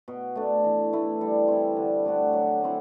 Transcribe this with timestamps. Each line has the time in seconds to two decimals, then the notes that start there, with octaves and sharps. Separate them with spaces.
0.08 B2
0.36 A3 D4
0.64 E3
0.93 A3 E4
1.21 G3
1.48 C4 E4
1.76 D3
2.05 A3 D4 F#4
2.33 F#3
2.61 A3 C4 E4